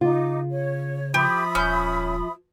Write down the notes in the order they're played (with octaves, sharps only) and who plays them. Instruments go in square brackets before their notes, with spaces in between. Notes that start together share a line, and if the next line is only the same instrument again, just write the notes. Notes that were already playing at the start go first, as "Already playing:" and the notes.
[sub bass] C#3 [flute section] D#4 D6 [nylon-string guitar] F4
[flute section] C#5
[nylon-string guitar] F3 [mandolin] G4 [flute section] E5 B5 D#6
[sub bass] D#1 [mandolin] C#4 G6